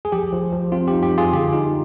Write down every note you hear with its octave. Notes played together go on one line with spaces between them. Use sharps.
G#4
F3 G4
F3
F3
C4 F4
G4
D#4
G4
F3 F4 G#4
D3 G4
D#4 F4